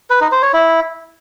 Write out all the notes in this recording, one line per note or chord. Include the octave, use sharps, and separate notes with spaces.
B4
D#4
C5
C#5
E4